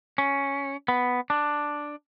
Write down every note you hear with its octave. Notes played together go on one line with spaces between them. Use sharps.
C#4
B3
D4